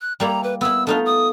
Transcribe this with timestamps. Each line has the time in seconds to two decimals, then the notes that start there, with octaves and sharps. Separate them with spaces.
0.01 F#6
0.20 G3 A#3 E4 A#5
0.43 B4
0.61 B3 E4 E6
0.87 A3 D4 D#4 F4
1.06 D#6